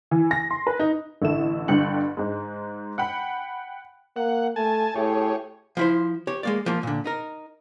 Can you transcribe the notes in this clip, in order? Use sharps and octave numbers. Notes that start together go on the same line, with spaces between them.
E3
A#6
C6
B4
D#4
A1 D3 E4 A4 E7
G1 G2 D3 G5 C#7 F#7
G#2 G#3
F#5 G5 B5
A#3 F#5
A3 G#5 A5
A2 G4 G#4 C#5
F3 E4 C5
G4 C#5
G#3 A#3 D5
F3 A#3
A#2 D3
D#4 A#4